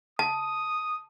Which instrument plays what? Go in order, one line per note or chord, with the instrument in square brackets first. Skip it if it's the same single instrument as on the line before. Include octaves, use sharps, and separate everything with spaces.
[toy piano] A5 [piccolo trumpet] D#6